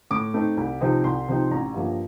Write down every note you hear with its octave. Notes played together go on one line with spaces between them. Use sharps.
A2 D6
A3 C4 D#4
C2
C3 F3 C4 D#4
C2 C6
C3 F3 C4 D#4
A1 A#5
G2 F3 A#3